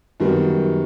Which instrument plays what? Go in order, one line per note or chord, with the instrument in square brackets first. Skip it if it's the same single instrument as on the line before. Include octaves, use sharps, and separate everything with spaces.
[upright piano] F#2 D#3 G3 B3